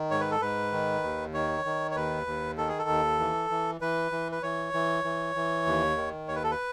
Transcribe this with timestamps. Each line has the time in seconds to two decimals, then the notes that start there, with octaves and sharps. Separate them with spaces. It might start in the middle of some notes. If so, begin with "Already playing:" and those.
Already playing: D#3
0.11 G#2 C#5
0.21 B4
0.31 A4
0.41 G#2 B4
0.72 D#3
1.03 D#2
1.34 D#3 C#5
1.65 D#3
1.91 C#5
1.96 D#2 B4
2.27 D#2
2.58 D#3 A4
2.68 G#4
2.79 A4
2.89 D#2
3.19 E3
3.50 E3
3.81 E3 B4
4.12 E3
4.32 B4
4.43 E3 C#5
4.74 E3
5.04 E3
5.36 E3
5.66 D#2
5.97 D#3
6.28 D#2 C#5
6.35 B4
6.44 A4
6.51 B4